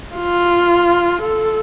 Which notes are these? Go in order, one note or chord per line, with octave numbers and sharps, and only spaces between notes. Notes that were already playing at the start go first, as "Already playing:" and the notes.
F4
A4